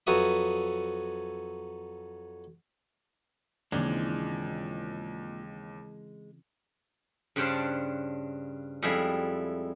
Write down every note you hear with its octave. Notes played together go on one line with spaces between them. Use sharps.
F2 F#3 F#4 B4 E5 D#6
D#2 A#2 C#3 E3 G#3 C4 D4
G2 C#3 D4 C5 D5 A5
F2 G3 G#3 E4 G#4